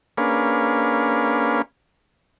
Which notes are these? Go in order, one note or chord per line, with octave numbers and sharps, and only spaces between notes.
A#3 C#4 D4 G#4 B4 F5